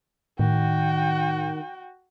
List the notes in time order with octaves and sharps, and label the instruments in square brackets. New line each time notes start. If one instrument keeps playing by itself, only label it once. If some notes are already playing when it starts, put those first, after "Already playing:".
[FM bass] A2 [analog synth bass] D#3 [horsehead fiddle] F#4 G5